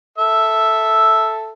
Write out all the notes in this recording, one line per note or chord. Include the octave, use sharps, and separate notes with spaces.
A4 E5